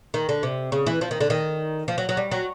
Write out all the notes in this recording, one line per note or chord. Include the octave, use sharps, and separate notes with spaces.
D#3
D3
C3
C#3
E3
F3
D#3
D3
D#3
F3
F#3
F#3
G3
F#3